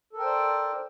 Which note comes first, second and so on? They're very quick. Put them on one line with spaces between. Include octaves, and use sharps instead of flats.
A4 A#4 G5 C5 D5